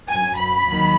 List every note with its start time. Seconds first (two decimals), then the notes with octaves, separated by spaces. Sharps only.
0.10 F#2 F#3 G#5
0.38 B5
0.66 D#2 D#3 F#3